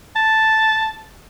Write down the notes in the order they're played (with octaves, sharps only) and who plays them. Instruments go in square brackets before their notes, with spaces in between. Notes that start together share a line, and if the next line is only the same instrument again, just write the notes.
[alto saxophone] A5